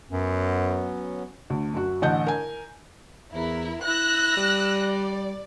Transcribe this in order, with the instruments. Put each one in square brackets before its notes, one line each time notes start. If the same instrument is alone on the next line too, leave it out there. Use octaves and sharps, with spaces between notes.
[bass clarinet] F#2 [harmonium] F#3 B3 C#4
[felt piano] D2
F#2 F#4
A1 D3 D#5 F#5 A5 G6
A#4 G#5
[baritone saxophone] E2 [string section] E4 A#4
[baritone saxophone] E4 [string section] E6 F#6 A#6
[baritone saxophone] G3
[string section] D5